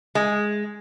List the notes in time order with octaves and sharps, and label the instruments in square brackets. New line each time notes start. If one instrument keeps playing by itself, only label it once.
[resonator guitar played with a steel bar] G#3